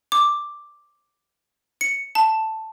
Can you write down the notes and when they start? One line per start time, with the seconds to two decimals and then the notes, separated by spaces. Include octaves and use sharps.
0.12 D6
1.81 C#7
2.15 A5